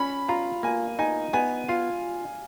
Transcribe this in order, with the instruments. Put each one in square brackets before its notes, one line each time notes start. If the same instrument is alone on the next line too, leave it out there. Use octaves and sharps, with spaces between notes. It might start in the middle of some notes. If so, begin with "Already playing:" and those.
Already playing: [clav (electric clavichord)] C#4 [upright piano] B5
[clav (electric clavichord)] F4 [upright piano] A#5
[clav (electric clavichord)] A#3 [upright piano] G#5
[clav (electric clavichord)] D#4 [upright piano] G#5
[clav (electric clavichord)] B3 [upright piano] G#5
[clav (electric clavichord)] F4 [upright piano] F5